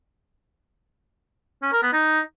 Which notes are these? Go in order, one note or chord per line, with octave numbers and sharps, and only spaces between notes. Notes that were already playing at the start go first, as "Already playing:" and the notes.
C#4
A#4
B3
D#4